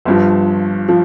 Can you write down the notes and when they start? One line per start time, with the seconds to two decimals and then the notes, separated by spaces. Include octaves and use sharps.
0.05 G1 G2 F3
0.89 F3